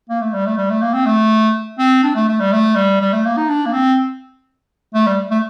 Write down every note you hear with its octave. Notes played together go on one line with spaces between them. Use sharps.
A#3
A3
G3
A3
G3
A3
A#3
C4
A3
C4
D4
A3
A3
G3
A3
G3
G3
A3
A#3
D#4
D4
A#3
C4
A3
G3
A3